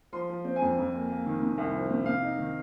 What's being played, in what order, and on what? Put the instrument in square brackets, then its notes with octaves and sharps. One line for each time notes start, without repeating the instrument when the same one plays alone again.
[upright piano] F3 C6
F3
C4
G#5
F2
F2
A#3
A#3
D#3
C3
C2
F3
C3
C3 F5
D#4
D#3